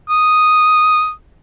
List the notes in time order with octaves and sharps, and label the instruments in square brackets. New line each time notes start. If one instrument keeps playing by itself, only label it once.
[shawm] D#6